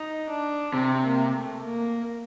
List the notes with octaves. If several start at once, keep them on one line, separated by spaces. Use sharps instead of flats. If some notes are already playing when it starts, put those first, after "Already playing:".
Already playing: D#4
D4
C3 C4
A#3
A3
A#3